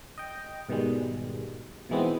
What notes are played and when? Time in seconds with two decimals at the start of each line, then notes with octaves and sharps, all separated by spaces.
0.18 D#5 G5
0.69 G#2 B2 D#3 G3 G#3
1.89 B2 D#3 E3 G#3 B3 C4